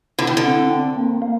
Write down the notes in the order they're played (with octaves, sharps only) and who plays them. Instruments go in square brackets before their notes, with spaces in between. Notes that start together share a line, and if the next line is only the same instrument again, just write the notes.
[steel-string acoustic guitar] D3 [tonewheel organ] E4
[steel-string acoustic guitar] D#3
D3
[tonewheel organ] C4
C4
A#3
A#3